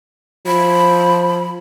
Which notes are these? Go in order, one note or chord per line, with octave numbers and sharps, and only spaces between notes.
F3 B5